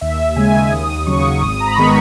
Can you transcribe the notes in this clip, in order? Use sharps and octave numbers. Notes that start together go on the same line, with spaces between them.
D#2 E5
C#3 G#3 G#5
D#2 D#6
C#3 F#3 C#6
G#1 D#6
A#5
B5
D#3 G#3 B3 C#6